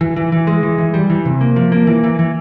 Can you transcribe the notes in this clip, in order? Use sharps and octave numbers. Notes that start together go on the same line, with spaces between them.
E3
E3
E3
G#3
E3
E3
G3
E3
C3
A#3
F3
A#3
E3
E3
E3